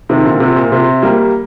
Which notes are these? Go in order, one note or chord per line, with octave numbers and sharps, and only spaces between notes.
C3 D#3
A#2 D3
C3
A#2
C3
G3 A#3